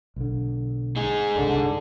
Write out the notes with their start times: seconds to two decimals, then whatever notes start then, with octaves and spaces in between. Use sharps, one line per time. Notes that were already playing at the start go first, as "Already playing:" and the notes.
0.16 B1 D3
0.96 D#4 G#4
1.35 F#1 C2 D3